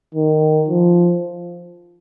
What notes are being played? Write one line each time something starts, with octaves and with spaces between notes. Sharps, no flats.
D#3
F3